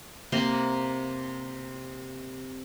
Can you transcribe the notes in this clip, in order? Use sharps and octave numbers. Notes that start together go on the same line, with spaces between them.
C3 A#3 A#5 C6